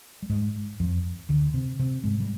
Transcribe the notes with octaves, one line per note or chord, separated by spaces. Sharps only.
G3
G#2 G#3
F2 F3
D2 D3
C3 C4
C3 C4
G#2 G#3
G3